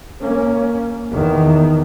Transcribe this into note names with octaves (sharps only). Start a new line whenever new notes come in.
A#3 C#4
E2 D#3